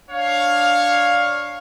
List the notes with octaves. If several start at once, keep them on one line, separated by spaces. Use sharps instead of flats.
D4 C#5 F5